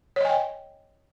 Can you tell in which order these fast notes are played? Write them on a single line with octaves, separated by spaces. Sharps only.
C#5 D#5 G#5 G5